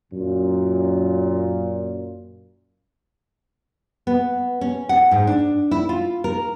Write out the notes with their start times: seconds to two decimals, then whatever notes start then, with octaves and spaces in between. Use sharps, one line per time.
0.13 F#2 A#2
4.07 B3
4.61 C#4
4.89 F#5
5.11 G#2
5.27 D4
5.71 E4
5.89 F4
6.24 A#4